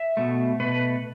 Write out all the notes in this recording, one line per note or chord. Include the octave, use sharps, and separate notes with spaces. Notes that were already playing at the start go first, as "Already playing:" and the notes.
Already playing: E5
B2 A3
B2 A3 B4